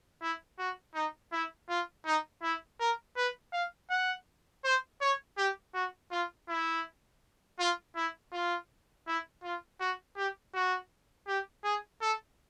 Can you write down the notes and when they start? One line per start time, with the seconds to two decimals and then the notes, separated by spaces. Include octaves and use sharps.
0.22 E4
0.59 F#4
0.95 D#4
1.33 E4
1.69 F4
2.06 D#4
2.43 E4
2.80 A#4
3.17 B4
3.53 F5
3.90 F#5
4.64 C5
5.01 C#5
5.38 G4
5.74 F#4
6.12 F4
6.49 E4
7.59 F4
7.96 E4
8.33 F4
9.07 E4
9.44 F4
9.80 F#4
10.17 G4
10.54 F#4
11.28 G4
11.64 G#4
12.02 A4